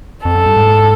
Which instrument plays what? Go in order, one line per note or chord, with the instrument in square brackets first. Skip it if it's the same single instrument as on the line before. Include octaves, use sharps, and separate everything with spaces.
[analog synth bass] F2 [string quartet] A4
[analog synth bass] F#2
G2
G#2